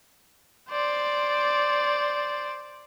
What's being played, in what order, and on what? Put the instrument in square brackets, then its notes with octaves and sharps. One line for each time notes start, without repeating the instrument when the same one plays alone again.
[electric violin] C5 D5